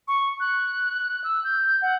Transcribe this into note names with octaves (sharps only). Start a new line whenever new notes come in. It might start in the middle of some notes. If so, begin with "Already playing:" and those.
C#6
F#6
E6
G6
F#5